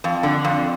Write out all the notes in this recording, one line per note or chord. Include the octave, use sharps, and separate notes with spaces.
F2
D3
F2